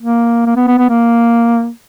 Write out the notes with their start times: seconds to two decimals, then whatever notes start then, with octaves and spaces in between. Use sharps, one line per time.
0.02 A#3
0.46 A#3
0.56 B3
0.68 B3
0.78 B3
0.90 A#3